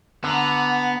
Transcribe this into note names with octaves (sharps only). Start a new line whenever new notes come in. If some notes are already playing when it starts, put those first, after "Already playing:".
D3 B3 F#5 A#5